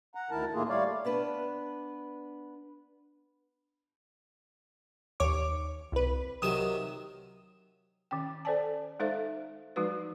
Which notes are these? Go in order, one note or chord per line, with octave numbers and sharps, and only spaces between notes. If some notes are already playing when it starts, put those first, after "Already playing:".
F#5 A#5
D2 D#3 E4 A#4 A5
A2 D#3 A3 A#3 F4 G#4
G3 A3 C#5 D5 F5
B3 D4 B4
D#2 C#5 D6
C2 B4
C3 D#3 F#3 D#6 E7
D#3 C#4 G5
A4 C5 D5 G#5 A5
G#3 D#4 A4 C5 E5 F5
F3 G#3 D#4 F#4 B4